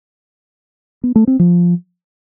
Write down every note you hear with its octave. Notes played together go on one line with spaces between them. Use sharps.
B3
A3
C4
F3